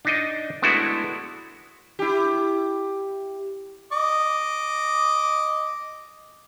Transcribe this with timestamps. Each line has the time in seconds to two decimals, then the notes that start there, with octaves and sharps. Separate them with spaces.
0.05 D4 D#4 D#5
0.62 G#3 A3 B3 D4 E4 F#4
1.99 E4 G4
3.92 D#5 D6